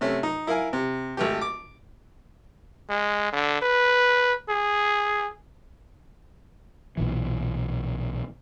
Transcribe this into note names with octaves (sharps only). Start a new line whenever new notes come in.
C3 A3 C#4
D#4
E4 A#4 F5 G#5
C3
G#1 A3 G4
D6
G#3
D3
B4
G#4
B1 A#2 E3